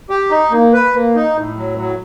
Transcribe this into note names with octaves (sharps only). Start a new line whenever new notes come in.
G4
D#4
A#3
B4
A#3
D#4
A2
F#3
F#3